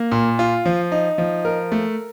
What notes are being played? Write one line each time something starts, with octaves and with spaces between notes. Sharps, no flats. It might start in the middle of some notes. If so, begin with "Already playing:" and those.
Already playing: A#3
A#2
F4
F3
D#4
F3
A#4
A3